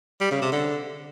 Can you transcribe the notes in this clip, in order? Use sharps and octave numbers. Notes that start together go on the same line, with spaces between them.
G3
C#3
C3
D3